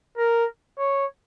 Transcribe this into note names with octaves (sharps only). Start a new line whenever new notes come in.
A#4
C#5